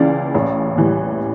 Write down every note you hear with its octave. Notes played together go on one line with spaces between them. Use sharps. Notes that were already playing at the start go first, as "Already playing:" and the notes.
Already playing: C#2 C#3 E3 D5 F5
A1
A2 E3 G3